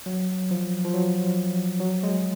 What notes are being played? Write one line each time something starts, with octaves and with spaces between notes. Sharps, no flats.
F#3
F3
F3
F#3
F#3
G#3